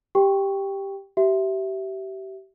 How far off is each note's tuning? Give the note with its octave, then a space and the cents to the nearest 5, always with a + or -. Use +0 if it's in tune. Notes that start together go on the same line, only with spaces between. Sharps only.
G4 +0 G5 +5 C#6 +0
G4 -30 E5 +0